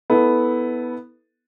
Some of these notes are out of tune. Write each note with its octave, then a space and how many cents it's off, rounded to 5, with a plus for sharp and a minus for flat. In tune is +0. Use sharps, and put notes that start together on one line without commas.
B3 +0 E4 -25 A4 +0